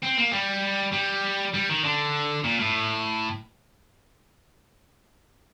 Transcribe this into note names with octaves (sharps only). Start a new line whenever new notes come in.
C4
A#3
G3
G3
G3
D#3
D3
A#2
A2